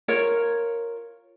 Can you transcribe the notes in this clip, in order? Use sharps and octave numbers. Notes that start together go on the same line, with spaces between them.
F4 A#4 C#5